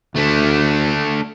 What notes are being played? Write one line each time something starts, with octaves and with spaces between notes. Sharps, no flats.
D2 A3 D4